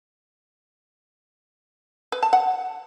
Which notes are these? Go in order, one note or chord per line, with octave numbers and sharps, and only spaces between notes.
B4
A5
F#5